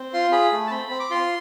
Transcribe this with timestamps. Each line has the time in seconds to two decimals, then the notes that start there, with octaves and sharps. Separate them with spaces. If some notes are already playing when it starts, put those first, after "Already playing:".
Already playing: C4
0.13 F4 C6
0.32 G#4 B5
0.53 A3
0.67 A5
0.71 C4 B5
0.90 C4
1.00 D6
1.10 F4 C6